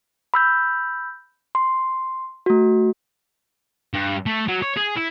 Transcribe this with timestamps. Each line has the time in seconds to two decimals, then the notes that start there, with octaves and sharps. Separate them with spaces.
0.34 B5 E6 G6
1.55 C6
2.46 A3 F#4
3.94 G2
4.26 A3
4.48 F#3
4.62 C#5
4.77 G#4
4.96 E4